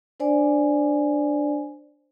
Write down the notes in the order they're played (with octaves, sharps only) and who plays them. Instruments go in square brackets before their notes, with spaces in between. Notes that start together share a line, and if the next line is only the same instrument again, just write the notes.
[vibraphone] D4 C5 D5 G#5